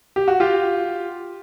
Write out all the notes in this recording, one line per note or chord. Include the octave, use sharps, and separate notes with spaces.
G4
F#4
F4 G4